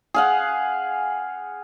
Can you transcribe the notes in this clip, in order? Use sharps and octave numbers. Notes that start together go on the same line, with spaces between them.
G#4 F5 F#5